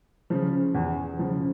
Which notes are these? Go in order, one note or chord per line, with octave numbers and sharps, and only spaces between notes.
C#3 F3
E2
C#3 F3